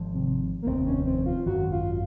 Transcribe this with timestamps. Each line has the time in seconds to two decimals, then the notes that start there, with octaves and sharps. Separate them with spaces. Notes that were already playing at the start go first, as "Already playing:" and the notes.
Already playing: G#1 F3 C4
0.14 C3
0.62 A#3
0.66 F1 D#2 D#3 C4
0.86 C#4
1.06 C4
1.26 F4
1.46 G#1 F#2 D#3 F#3 F#4
1.72 F4